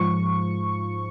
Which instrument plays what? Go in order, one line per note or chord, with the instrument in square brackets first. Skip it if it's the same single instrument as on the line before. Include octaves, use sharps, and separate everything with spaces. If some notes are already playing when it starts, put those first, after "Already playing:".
Already playing: [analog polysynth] G#2 F3 C#6